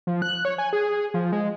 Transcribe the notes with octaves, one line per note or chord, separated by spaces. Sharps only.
F3
F#6
C#5
G#5
G#4
F3
G#3